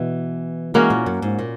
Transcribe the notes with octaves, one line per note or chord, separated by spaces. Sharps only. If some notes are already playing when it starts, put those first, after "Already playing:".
Already playing: B2 E3
E3 G#3 A#3 C#4 F#4
A#2
F#2
G#2
A#2